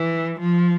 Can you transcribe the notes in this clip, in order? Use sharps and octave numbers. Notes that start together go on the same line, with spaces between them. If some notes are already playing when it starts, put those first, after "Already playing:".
Already playing: E3
F3